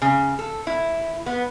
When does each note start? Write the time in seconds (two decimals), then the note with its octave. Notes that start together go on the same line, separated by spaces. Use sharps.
0.02 C#3
0.39 A4
0.67 E4
1.26 B3